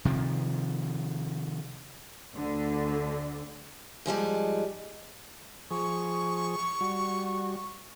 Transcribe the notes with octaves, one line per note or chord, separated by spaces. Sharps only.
C3 D#3 F3
D2 D3
G#2 F3 G3 G#3
F3 G#4 C#6
G3 F#4